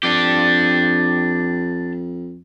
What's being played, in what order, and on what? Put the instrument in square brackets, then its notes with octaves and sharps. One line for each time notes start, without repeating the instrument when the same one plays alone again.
[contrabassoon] F2 [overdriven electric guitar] D4 G4